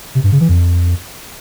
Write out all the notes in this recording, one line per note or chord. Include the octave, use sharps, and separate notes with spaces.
C3
G2
C#3
E3
F2